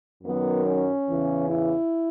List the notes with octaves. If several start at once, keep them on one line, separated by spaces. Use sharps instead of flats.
F#2 D#3 F#3 B3
C#4
E2 C#3 E3
E4